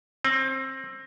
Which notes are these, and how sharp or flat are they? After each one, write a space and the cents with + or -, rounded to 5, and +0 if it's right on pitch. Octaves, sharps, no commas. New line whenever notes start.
C4 +25